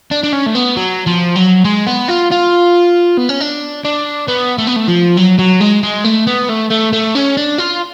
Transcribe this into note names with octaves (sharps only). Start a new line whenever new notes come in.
D4
D4
C#4
A3
B3
F#3
F3
F#3
G#3
B3
F4
F4
B3
C#4
D4
D4
B3
A3
B3
A3
F3
F#3
F#3
G#3
G#3
A3
B3
A3
A3
A3
C#4
D4
F4